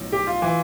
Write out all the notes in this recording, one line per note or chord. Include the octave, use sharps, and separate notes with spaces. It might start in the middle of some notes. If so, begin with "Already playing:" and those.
Already playing: B1 A2 F3
G4
F4
E3